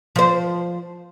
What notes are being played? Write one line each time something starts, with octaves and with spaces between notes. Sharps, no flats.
F3 C5